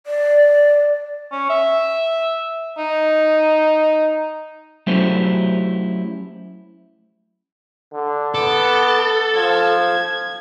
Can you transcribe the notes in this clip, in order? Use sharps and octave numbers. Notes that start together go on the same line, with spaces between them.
D5
C#4
E5
D#4
F#3 A3 C#4 E4 G4 C5
D3
B3 A4 D6
F3 G#6